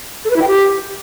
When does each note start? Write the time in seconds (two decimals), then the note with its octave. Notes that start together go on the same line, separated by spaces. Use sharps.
0.25 A4
0.30 B4
0.36 E4
0.42 G5
0.48 G4